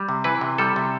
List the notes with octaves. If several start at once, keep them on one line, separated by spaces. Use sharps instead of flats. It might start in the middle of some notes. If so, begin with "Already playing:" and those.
Already playing: G3
C3
E3 B4
C3
G3 A4
C3